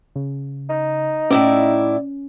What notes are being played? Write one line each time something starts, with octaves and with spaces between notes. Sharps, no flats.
C#3
D#4
A2 C#4 E4 D5